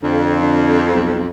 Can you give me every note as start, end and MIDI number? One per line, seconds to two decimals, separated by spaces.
0.03 1.28 41
0.03 0.39 50
0.42 0.82 50
0.93 1.22 35